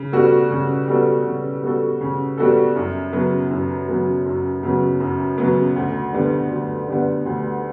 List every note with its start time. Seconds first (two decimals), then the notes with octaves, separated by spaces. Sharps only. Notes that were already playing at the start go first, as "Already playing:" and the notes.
Already playing: C#3
0.12 G3 B3 F#4 A4
0.51 C#3
0.88 G3 B3 F#4 A4
1.26 C#3
1.63 G3 B3 F#4 A4
2.01 C#3
2.37 G3 B3 F#4 A4
2.76 F#2
3.13 C#3 F#3 B3
3.51 F#2
3.88 C#3 F#3 B3
4.26 F#2
4.63 C#3 F#3 B3
5.00 F#2
5.38 C#3 F#3 B3
5.76 D2
6.13 D3 G3 B3
6.51 D2
6.88 D3 G3 B3
7.26 D2